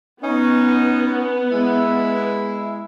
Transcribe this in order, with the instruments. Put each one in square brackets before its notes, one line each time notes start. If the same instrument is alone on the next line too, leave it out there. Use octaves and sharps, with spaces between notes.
[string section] B3 [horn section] C#4 D#4
[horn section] G#3 E4